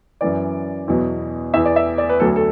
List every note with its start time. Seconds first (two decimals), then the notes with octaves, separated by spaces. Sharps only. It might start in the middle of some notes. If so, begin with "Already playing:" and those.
0.21 F#2 E3 D5
0.88 E2 B2 F#3
1.54 E2 E3 E5
1.65 D5
1.76 E5
1.98 D5
2.09 B4
2.20 D2 D3 F#3 A4
2.36 A4